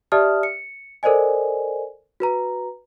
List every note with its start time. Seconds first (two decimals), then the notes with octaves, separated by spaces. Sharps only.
0.12 G4 D5 E5 A5 D#6 F6
0.43 C#7
1.03 A4 A#4 C5 D5 D#5 G#5
2.20 F#4 B4 A#5